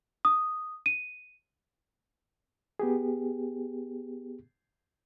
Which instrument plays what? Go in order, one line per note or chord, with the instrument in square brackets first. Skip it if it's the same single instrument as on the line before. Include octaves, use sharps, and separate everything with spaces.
[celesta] D#6
D#7
[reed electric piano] B3 G4 G#4